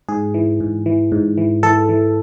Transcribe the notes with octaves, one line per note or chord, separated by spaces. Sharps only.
G#2 G#4
E3
G#2
E3
G#2
E3
E3 A4
E3